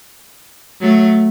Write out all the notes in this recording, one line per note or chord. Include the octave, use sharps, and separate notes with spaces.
F#3 A3